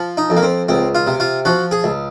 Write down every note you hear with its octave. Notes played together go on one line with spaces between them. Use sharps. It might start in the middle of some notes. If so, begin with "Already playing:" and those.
Already playing: F3
D#4
F2
A#3
C4
C#2 C4
F4
C3
F4
F3 F#4
G#4
C#2